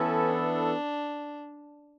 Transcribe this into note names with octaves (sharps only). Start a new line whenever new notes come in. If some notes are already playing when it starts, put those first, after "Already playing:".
Already playing: E3 B3 C#4 E4 A4
D4